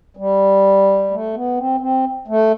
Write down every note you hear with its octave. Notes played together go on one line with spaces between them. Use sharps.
G3
A3
B3
C4
C4
A3